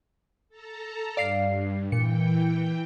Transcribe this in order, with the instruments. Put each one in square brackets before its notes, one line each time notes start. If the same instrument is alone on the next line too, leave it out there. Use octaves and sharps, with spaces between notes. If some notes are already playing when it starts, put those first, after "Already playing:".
[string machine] A4 A5 A#5
[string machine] G2 [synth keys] D5 F5 C7
[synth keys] A#2 C#7 [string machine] E3 G5